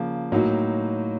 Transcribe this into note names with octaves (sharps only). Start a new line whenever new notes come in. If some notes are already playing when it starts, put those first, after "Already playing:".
Already playing: C#3 F3 A#3
A2 F#3 A#3 D#4 F#4